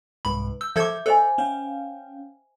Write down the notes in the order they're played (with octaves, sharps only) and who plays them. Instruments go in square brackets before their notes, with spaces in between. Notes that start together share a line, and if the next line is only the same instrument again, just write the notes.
[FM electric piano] C2 G#2 B4 [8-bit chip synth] B5
[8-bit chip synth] E6 [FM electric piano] G6
[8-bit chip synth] F3 A4 G#6 [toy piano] E5 D6
[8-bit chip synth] A4 [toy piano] C5 D#5 G#5
[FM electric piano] C#4 F5 G5